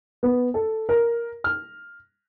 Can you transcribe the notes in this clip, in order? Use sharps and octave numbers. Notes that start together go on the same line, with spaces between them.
B3
A4
A#4
F6